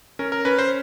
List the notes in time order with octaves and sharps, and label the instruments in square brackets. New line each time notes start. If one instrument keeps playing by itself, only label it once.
[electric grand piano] C#4 A#4
A#4
C#4 B4
C5